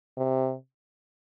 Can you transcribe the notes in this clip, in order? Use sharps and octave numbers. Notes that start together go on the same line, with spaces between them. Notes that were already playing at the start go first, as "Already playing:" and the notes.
C3